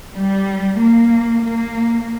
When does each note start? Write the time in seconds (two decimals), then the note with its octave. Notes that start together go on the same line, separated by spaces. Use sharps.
0.14 G3
0.80 A#3
1.44 A#3